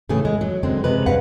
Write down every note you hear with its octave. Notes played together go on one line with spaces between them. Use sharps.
A2 C#3 E3 A3 G#4
G#3
F#3
F#2 D3 G#3 C4
C3 G#3 B4
G2 B4 F5 F#5